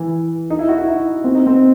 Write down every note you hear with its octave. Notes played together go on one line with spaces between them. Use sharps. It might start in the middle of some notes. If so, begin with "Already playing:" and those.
Already playing: E3
D#4
E4
F#4
E4
D#4
C4
D#4
C4